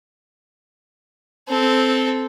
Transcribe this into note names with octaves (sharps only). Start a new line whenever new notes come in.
C4 A4